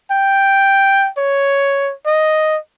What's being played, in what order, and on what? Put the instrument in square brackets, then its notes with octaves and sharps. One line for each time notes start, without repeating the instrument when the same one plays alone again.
[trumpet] G5
C#5
D#5